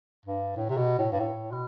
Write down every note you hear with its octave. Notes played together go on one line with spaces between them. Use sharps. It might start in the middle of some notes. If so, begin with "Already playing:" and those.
G2
A2
C3
B2
A2
G2
A2
B2